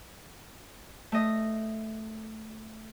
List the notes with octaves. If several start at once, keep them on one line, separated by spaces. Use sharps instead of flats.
A3 D#5